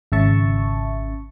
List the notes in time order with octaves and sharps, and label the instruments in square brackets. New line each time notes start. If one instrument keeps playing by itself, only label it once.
[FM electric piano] G#1 C#3 E5 A5 C#6